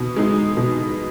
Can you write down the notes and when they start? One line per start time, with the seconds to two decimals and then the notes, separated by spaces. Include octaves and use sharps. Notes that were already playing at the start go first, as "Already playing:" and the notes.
Already playing: B2 D#4
0.16 G#3 D#4
0.57 B2